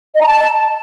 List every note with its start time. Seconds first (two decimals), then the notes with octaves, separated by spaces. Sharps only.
0.15 D#5
0.21 A#5
0.27 A5